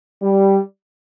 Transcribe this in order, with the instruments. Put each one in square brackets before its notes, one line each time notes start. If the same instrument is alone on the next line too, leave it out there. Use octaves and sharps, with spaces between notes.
[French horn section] G3